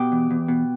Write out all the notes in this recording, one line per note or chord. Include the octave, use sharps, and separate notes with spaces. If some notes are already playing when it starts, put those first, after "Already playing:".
Already playing: B2 G4
E2
E2
B2